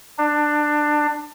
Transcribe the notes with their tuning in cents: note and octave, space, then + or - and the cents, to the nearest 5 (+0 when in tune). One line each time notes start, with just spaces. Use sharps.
D4 +20